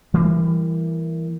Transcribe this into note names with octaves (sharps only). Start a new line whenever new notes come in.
E3 G3 A#3